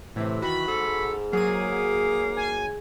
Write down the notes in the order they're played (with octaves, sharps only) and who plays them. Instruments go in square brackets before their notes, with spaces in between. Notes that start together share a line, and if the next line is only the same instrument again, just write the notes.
[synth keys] A2 C3 [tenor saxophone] E3
[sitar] D#3 [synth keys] F#4 [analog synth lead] B5
[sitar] G#2 [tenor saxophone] A4
[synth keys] F#3 D#7 [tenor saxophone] A#3 [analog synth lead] G#4
[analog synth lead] G#5